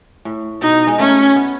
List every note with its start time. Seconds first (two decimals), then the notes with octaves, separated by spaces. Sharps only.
0.25 A2
0.62 B2 D#4
0.87 G#3
0.99 A3 C#4
1.36 B3